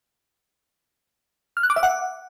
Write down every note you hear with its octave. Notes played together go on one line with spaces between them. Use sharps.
F6
F#6
D6
E5
F#5